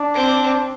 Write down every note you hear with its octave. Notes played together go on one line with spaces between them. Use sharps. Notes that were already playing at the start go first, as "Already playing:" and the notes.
Already playing: D4
C4